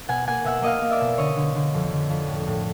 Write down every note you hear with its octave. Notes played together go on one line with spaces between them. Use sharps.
B2 F#5 G#5
A#3 F#5 G#5
B2 E5 F#5
A#3 D#5 F5
A#3
D5 E5
B2
D3 C#5 D#5
D3
D3
F2
D3
F2
A2
A2